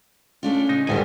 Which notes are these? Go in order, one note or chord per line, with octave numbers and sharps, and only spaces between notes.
A3 C#4 D4 F4
C#3 D#4
G#1 D2 G#2 D#3 G3 G#5